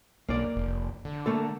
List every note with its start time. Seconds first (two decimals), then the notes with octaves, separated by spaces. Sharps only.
0.29 B1 A#3 D5
0.56 F1
1.05 D3
1.26 A3 A#3 A4